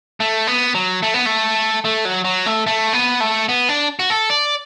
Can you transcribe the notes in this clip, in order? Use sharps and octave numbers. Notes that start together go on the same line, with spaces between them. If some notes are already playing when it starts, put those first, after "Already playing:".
A3
B3
F#3
A3
B3
A3
A3
F#3
F#3
A3
A3
B3
A3
B3
D4
F#4
A4
D5